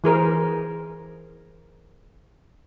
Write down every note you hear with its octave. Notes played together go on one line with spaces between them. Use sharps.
E3 G#4 A#4 C5